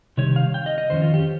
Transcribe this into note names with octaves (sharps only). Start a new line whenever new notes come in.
C3 D#3 G3 C#5
F5
G5
D#5
D#5
F2 D#3 C#4 C5
F4
G4